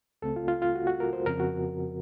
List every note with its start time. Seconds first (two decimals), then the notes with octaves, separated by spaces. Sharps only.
0.22 C#2 C#3 A3 C4 A4
0.36 F4
0.48 F4
0.62 F4
0.75 F#4
0.87 F#4
1.00 A#4
1.13 C5
1.26 F2 C#3 F3 C4 A#4
1.40 F#4